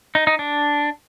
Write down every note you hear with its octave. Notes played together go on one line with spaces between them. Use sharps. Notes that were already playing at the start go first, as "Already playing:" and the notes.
D#4
D#4
D4